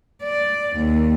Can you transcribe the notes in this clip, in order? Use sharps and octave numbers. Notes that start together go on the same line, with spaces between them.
D5
D#2